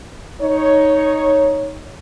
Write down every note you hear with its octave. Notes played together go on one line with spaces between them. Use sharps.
D#4 C#5